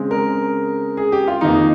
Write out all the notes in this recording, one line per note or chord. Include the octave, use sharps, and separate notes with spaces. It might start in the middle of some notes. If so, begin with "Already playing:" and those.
Already playing: C#3 G#3 C4
A#4
G#4
G4
F4
F2 D#3 A#3 D#4